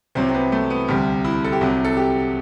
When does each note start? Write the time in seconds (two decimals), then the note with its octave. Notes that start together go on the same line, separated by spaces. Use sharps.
0.15 C2 C3 F#3 C4
0.28 C4
0.34 B3
0.52 A3
0.70 B3
0.88 D2 C3 G3
1.24 E4
1.44 A4
1.53 G4
1.61 C2 C3 F#3 F#4
1.84 A4
1.97 G4